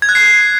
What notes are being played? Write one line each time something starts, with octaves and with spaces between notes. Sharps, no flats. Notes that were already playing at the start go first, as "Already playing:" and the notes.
G#6
F#6
C7